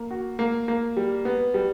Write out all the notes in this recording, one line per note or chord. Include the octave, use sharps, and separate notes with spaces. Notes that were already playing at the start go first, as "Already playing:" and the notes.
Already playing: A#3
F#4
A#3
A#3
G3
B3
G3